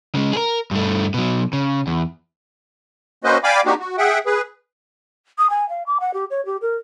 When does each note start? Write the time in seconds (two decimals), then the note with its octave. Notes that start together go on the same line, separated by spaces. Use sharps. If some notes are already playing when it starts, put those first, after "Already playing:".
0.15 C#3 G#3
0.33 G#4 A#4
0.71 G2 A3
1.14 B2 F#3
1.53 C#3
1.87 E2
3.24 A#3 C#4 F#4 B4 C5 D#5
3.44 D5 F5 G5 G#5 B5 D6
3.65 A#3 C4 D4 D#4 F#4 G4
3.80 F#4
3.98 G#4 E5 F#5 G5
4.26 G#4 B4
5.38 D#6
5.50 G#5
5.69 F5
5.87 D6
6.00 F#5
6.14 G4
6.30 C#5
6.46 G4
6.62 A#4